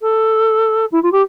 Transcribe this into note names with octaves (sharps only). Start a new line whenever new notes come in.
A4
E4
F4
G4